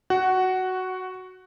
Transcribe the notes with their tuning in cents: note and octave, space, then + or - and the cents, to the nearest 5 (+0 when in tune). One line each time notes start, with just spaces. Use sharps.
F#4 +0 F#5 +15